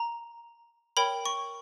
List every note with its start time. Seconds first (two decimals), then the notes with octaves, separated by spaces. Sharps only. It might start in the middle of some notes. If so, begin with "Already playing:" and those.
Already playing: A#5
0.97 A#4 C#5 G5 B5
1.26 C#6